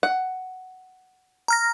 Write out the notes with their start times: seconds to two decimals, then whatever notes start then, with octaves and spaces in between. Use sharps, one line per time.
0.03 F#5
1.48 A#5 F6 A#6